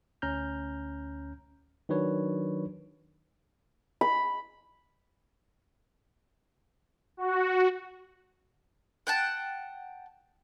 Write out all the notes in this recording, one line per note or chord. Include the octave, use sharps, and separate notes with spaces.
D2 C#4 A#5 F6 G6
D#3 F#3 D4 B4 C#5
B5
F#4
F#5 G5 A5